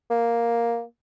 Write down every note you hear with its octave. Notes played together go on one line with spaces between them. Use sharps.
A#3